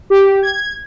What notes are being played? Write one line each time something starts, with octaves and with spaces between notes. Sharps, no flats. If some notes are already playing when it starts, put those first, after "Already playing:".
G4
G#6